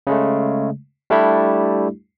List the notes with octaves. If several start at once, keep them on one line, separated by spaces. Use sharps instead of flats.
C#3 G#3 A3
G3 A3 D4 E4 G4